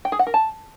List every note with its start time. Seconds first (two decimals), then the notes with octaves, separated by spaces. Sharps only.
0.05 G5
0.12 G#4
0.19 F#5
0.27 A#4
0.34 A5